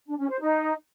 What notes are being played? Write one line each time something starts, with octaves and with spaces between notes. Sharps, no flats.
D4
C#4
C5
D#4